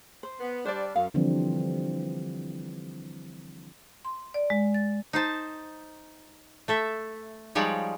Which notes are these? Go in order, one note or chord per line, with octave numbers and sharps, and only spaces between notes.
C5
B3
G3 D4 C5 D5
F#2 F5
D3 E3 F3 G3 C4 D4
C6
D5
G#3
A6
D#4 C5 A5
A3 A4 E5
F3 G3 G#3 D#4 C#5 D5